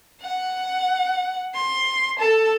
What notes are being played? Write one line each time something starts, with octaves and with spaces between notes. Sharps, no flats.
F#5
C6
A4